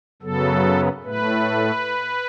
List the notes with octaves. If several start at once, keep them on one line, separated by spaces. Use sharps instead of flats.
F#2 C#3 F#3 B3 A4
A2 A3 B4